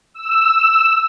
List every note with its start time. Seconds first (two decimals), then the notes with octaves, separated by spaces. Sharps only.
0.14 E6